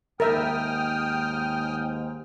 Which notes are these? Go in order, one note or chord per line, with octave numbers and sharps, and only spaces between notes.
D#2 G#2 A#4 E5 G5 D#6 F6